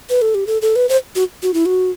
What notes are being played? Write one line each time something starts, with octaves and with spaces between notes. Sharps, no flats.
B4
A4
G4
A4
A4
B4
C5
F#4
F#4
E4
F#4